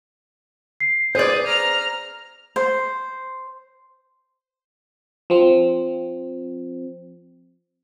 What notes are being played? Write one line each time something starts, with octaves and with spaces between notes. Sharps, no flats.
C7
G#4 B4 C5 D5
A#5 F6
C5
F3 C4